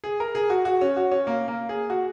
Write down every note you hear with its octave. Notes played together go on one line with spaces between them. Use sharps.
G#4
A#4
G#4
F#4
F#4
C#4
F#4
C#4
A#3
A#3
G#4
F#4